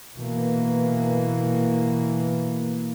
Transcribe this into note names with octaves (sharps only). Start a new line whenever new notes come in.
B2 E3 A#3